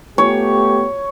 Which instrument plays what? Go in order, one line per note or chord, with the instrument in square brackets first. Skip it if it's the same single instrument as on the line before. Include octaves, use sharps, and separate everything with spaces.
[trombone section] A3 B3 G4 [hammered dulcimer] C#5